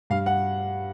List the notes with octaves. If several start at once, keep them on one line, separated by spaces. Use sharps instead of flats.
G2 F5
F#5